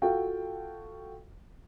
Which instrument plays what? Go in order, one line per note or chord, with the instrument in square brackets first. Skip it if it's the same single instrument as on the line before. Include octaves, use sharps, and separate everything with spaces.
[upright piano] F4 F#4 A4 F5 G5